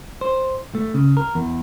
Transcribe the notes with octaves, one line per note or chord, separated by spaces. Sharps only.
C5
A3
C#3
A#4
E2